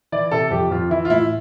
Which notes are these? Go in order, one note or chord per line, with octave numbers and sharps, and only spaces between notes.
E3 D5
C3 A4
F2 G4
F2 F4
E3 E4
F4
A2 E4